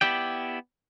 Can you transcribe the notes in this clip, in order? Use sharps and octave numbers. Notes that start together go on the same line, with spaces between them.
B3 E4 G4 D5 G5